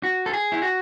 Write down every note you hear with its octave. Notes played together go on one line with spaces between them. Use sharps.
F#4
A4
G#4
E4
F#4